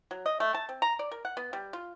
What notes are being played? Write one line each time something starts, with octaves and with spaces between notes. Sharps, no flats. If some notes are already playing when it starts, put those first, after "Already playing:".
F#3
D#5
A3
A5
C4
A#5
D5
A#4
F#5
B3
G3
F4